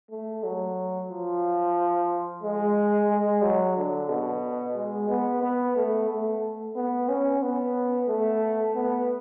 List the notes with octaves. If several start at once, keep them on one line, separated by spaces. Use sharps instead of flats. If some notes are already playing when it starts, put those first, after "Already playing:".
A3
F#3
F3
G#3
G#3
F#3
D3
B2
G#3
B3
B3
A3
A3
B3
C#4
B3
A3
B3